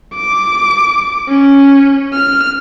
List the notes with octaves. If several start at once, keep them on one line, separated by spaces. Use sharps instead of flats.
D6
C#4
F6